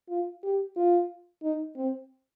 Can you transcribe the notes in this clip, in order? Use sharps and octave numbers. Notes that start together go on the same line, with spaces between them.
F4
G4
F4
D#4
C4